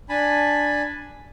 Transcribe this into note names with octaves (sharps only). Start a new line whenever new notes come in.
D4 G#5 A5 B5